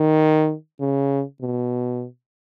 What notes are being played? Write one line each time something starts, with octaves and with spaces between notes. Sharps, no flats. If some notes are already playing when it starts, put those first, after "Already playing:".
Already playing: D#3
C#3
B2